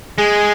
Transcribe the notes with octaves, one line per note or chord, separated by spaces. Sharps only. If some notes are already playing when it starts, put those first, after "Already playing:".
G#3 G#4